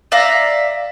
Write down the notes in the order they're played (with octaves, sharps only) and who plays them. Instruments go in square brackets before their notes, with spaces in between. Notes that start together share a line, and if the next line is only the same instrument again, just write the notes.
[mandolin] D5 E5 F5 A#5